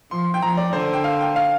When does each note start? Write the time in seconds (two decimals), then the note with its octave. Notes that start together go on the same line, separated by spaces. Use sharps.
0.11 F3 C6
0.34 G5
0.42 F3 A#5
0.57 D5
0.73 D3 C5
0.93 G5
1.04 F5
1.21 G5
1.36 F5